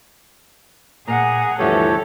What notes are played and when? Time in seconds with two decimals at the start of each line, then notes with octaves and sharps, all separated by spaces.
1.07 A#2 G#4 F#5 A#5
1.59 D2 G2 E3 F3 G4 A4 C#5